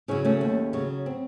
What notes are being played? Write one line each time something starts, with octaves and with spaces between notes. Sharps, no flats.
C#3 F#3 C#4 E4
A3 C#4
D#2
C#3 F#3
C4